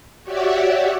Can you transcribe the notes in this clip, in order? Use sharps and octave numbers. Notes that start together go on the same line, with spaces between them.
F#4 G4 C#5 D5 E5 F#5